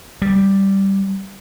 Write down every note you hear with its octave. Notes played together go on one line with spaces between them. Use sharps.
G3